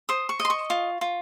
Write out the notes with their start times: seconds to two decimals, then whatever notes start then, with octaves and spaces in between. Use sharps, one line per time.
0.09 C5 D#6
0.29 C#6
0.40 D#5
0.45 C6
0.50 C#6
0.70 F4
1.01 F4